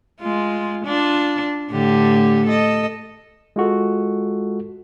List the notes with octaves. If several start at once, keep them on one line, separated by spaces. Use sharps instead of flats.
G#3 F4
D4 F4
A2 D3 G4
A4 D#5
G#3 F4 F#4 A4